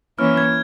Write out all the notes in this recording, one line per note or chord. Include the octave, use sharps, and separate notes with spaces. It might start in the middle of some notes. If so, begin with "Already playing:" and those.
E3 A#3 C#4 E4 F6
G#6